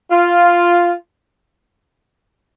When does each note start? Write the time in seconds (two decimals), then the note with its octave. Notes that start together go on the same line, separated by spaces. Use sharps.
0.11 F4